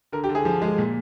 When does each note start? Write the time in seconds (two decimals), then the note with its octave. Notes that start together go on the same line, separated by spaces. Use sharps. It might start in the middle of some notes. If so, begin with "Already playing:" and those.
0.12 D3 A#4
0.24 G4
0.29 D3
0.35 G#4
0.45 F3
0.62 G#3
0.78 A#2